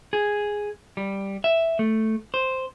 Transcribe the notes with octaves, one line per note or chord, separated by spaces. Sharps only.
G#4
G3
E5
A3
C5